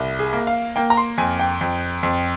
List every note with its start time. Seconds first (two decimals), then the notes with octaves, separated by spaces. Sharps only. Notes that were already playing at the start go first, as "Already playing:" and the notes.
Already playing: C2
0.19 G#4
0.33 A#3
0.47 F5
0.76 A#3 G5
0.90 A#5
0.97 C6
1.18 F2 G#5
1.39 G5
1.61 F2
2.03 F2